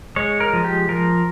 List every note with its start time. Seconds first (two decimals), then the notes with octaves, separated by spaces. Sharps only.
0.16 G#3 C#5
0.40 A#4
0.53 F3
0.64 G4
0.89 F3 A#4